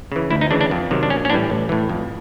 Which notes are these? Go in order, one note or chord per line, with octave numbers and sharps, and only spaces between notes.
C#3 E3
D2 E4
D#4
C#3 E3 D4
D4
F2
C3 D#3 F#3
D4
A#1 C#4
C#4
A2 E3 G3 D4
A1
A2 E3
F2